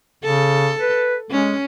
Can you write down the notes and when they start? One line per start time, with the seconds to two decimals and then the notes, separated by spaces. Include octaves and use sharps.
0.24 C#3 A4
0.81 B4
1.31 G#3 C#4